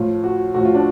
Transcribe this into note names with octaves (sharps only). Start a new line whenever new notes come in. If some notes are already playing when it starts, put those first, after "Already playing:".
Already playing: A2 F3 F4
F#4
A2 F3 F#4
F4
D4